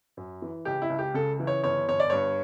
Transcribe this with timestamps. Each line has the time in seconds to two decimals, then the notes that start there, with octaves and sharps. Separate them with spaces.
0.17 F#2
0.42 E3
0.65 C#2 G4
0.82 E4
0.90 C#2
0.99 G4
1.14 C#3 A4
1.40 E3
1.47 C#5
1.64 G1 C#5
1.88 G1 C#5
2.00 D5
2.10 G2 C#5